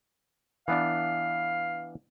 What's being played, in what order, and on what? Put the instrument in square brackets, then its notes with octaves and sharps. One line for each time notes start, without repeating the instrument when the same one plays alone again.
[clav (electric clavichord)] E3 B3 D4 [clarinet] F5